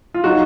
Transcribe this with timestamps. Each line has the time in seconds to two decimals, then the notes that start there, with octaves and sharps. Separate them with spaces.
0.14 F4
0.24 F#3 D#4 F#4